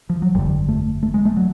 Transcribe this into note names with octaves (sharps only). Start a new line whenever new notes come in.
F3
F#3
G1 F2 D3 G3
A3
A3
G#3
A3
F#3